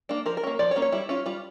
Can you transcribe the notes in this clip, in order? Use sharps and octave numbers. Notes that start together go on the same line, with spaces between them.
A#3 D4
F3 A#4
A#4
A#3 C#4
F3 D5
C#5
A#3 C#4
C#5
G3 E4
C#4 F4
G3 F4